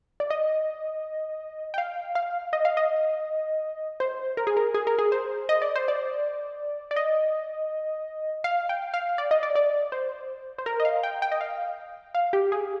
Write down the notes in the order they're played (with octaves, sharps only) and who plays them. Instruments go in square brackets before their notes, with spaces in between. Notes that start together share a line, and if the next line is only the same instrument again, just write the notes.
[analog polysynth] D5
D#5
G5
F5
F5
D#5
F5
D#5
C5
A#4
G#4
A#4
G#4
A#4
G#4
C5
D#5
D5
C5
D5
D5
D#5
F5
G5
F5
D5
D#5
D5
D5
C5
C5
A#4
D#5
F5
G5
G5
D#5
F5
F5
G4
G#4